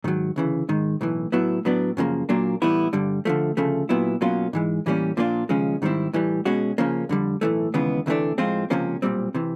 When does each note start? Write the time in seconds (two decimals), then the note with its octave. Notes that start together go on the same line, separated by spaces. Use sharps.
0.04 G#2 D#3 F#3
0.36 D2 C#3 E3
0.69 G#2 D#3 G#3
1.01 B1 A2 E3
1.32 A2 F#3 B3 E4
1.65 A2 F#3 B3 D4
1.97 F#2 C#3 F3 A#3
2.29 A#2 F#3 A#3 D4
2.62 A2 E3 G3 B3 E4
2.93 G2 D3 G3
3.25 D3 F3 A3
3.57 D2 C#3 F3 A3
3.89 A#2 F#3 B3 E4
4.21 B2 F#3 A#3 C#4 F4
4.53 G#2 E3 G#3
4.86 A2 E3 G3 A#3 C#4
5.17 A#2 F3 A#3 D4 F4
5.49 D#2 C#3 F3 G#3 C#4
5.82 G#2 D#3 G3 C4 E4
6.13 A2 E3 G3
6.45 B2 G#3 C#4 F#4
6.78 C#3 F3 A#3 C#4
7.09 F2 D3 G3
7.41 B1 A2 E3 A3
7.74 D#2 C#3 E3 G#3 B3
8.06 D2 C3 E3 A3 D4
8.38 A2 F3 G#3 C4 F4
8.70 C#2 C3 F3 A#3 C#4
9.02 B1 A#2 G3 C4
9.34 C3 E3